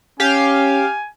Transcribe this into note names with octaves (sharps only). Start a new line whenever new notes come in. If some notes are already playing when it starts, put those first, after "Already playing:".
C#4 G4 F5 G#5